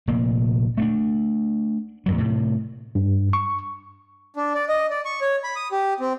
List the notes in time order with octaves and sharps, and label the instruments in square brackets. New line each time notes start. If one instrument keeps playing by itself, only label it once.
[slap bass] F1 A#2 A#3
A3 B3 D4
E2 G2 F#3
A2 C3
[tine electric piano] G2
C#6
[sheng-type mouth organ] D4
D5
D#5
D5
C#6
C#5
B5
D#6
G4
C4